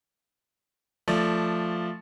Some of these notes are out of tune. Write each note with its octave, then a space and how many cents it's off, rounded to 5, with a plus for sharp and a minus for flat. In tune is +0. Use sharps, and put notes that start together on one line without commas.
F3 +0 A3 +5 D5 +0